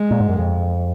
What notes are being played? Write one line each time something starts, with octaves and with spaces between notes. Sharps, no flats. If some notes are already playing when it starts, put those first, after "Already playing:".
Already playing: G#3
A#2
G#2
F#2
F2